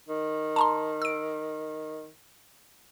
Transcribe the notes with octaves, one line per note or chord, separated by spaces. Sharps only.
D#3
A5 A#5 C6
E6 D7